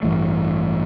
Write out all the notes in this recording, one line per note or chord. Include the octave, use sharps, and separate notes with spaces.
A1 G2 E3 A3